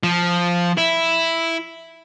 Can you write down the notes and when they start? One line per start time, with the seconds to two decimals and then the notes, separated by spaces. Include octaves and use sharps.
0.03 F3
0.78 E4